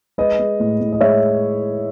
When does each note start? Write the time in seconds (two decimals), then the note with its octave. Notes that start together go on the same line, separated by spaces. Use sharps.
0.18 G#3 B4 D#5
0.39 G#3
0.60 A2
0.80 A2
0.92 D#5
1.01 G#3 C#5 E5